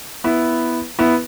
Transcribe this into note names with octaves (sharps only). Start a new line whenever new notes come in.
B3 E4
B3 E4